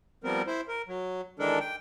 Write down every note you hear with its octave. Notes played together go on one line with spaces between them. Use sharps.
F3 G3 B3 C4 A#4
E4 C5
A#4
F#3
D#3 E3 G#3 D4 A4 A#4
G5